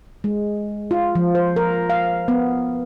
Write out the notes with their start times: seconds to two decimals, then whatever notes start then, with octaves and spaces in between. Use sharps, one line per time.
0.24 G#3
0.91 F4
1.15 F3
1.35 C5
1.56 A#4
1.90 F5
2.28 B3